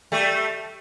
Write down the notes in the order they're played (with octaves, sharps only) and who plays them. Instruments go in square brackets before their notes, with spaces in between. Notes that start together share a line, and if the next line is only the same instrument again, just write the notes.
[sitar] G3 A3